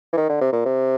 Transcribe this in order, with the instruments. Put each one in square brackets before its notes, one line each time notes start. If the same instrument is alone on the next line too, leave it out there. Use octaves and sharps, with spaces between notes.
[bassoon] E3
D#3
D3
C3
A#2
C3